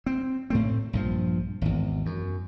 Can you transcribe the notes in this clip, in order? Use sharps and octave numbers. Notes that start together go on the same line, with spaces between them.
C4
A2 A3 C4
A#1 G2 F3
G#1 E2
F#2